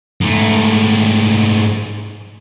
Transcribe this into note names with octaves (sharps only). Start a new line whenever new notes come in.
G#2 A3